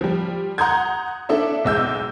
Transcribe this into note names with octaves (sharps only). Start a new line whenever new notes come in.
F3 G3
F#5 A#5 C6 D#6 G6 G#6
D4 A4 D5 E5
B1 G#3 E6 G6